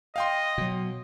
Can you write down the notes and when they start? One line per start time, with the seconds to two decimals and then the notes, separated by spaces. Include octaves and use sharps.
0.16 D#5 F5 G5 C6
0.58 B2 F#3